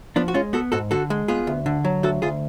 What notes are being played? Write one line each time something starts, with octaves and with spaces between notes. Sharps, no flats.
F3 B3 D4
F#4
G#3 C#4 F4
B3 F#4 A4
G#2 F#4 A4
D3 F#4 A4
G#3
B3 F4 G#4
D2
D3
F#3
D2 F#4 A4
D2 F4 G#4